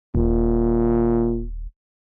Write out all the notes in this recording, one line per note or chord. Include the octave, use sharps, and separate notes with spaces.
D#1 A#2